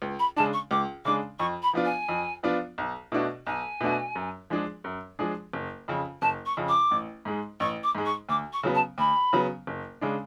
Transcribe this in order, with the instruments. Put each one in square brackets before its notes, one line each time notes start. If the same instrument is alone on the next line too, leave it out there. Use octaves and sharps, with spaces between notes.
[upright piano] C#2
[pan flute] B5
[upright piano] C#3 G#3 D4 [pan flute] A5
[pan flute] C#6
[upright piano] C#2 [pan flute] D6
[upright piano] C#3 G#3 D4 [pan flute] D6
[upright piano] F2 [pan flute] C#6
[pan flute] B5
[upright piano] F3 B3 D4 F4
[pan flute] G#5
[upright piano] F2
F3 B3 D4 F4
B1
B2 A3 D4 F#4
[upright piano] B1 [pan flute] G#5
[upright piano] B2 A3 D4 F#4
F#2
F3 G#3 D4 G#4
F#2
F3 G#3 D4 G#4
F#1
F2 C#3
[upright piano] F#1 [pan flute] A5
[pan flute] C#6
[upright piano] F2 C#3
[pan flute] D6
[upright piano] A1
G#2 G#3
[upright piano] A1 [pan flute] C#6
[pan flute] D6
[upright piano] G#2 G#3
[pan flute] C#6
[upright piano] D2 [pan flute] D6
[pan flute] C#6
[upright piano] C#3 F#3 B3
[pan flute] A5
[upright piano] D2 [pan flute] B5
[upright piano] C#3 F#3 B3
F#1
C#3 G#3 D4